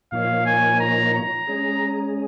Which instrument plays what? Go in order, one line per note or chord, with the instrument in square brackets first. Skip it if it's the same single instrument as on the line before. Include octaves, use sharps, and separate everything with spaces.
[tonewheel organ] A#2 F3 A#3 D#4 C#5 [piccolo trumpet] F5
[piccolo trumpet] G#5
A#5
A#5
[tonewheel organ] G#3 C#4 G#4